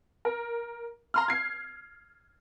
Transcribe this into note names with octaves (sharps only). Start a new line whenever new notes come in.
A#4
A#5 C6 F6
G#6 C7